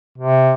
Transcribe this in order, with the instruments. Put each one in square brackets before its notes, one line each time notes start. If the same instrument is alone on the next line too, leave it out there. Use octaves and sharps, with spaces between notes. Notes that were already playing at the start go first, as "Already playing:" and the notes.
[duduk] C3